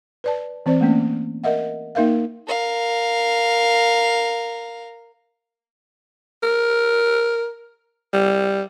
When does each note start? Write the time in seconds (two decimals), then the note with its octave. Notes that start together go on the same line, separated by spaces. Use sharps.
0.24 B4 D5 A5
0.66 E3 C4 C5 D5
0.81 A3 A#3 C#4
1.44 A#4 D#5 E5 F#5
1.95 A#3 D#4 A#4 E5 F5
2.47 A#4 F5
6.43 A#4
8.14 G3